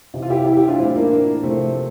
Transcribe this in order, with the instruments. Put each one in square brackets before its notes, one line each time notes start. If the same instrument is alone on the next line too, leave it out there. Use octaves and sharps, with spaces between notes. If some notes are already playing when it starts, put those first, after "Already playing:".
[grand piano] C3 E3
F4
E4 G4
E4 G4
E4 G4
D4 F4
A2 E3 C4 E4
A#3 D4
C3 F3 A3 C4